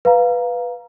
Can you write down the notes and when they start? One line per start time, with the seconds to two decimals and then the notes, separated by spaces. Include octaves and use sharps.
0.05 B4 F5 A#5